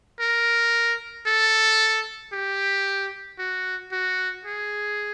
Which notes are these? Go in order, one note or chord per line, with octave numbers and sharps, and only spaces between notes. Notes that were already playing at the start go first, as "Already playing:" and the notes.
A#4
A4
G4
F#4
F#4
G#4